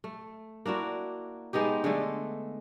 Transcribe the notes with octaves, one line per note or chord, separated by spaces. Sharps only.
A3
A#3 D4 E4 F#4
G#3 B3 D#4 G4
D3 G#3 A3